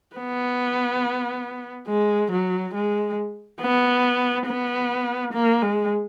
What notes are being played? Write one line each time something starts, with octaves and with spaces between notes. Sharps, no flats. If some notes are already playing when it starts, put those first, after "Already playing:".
B3
G#3
F#3
G#3
B3
B3
A#3
G#3